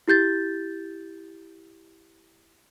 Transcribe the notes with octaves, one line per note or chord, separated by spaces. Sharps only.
E4 G4 G6 A6